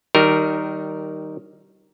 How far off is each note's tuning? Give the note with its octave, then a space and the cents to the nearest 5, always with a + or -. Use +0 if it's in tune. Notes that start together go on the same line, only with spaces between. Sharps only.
D#3 +0 G3 -25 A#4 +0